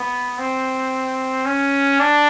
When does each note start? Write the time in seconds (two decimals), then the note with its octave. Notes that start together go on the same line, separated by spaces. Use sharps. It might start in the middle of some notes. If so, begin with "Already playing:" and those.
Already playing: B3
0.38 C4
1.45 C#4
1.99 D4